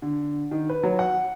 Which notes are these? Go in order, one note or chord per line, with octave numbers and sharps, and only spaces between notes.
D3
D#3
B4
F#3
F#5